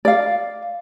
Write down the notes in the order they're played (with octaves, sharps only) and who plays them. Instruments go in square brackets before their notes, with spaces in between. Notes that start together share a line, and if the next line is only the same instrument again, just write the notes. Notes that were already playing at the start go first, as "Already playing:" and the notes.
[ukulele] D5 F5